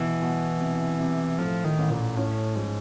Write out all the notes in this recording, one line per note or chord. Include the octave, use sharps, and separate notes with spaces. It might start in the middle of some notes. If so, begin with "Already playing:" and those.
Already playing: B2 E3
B2
C3
C3
A2 F3
D#3
A1
A#2
A2 C#4
G#2 F3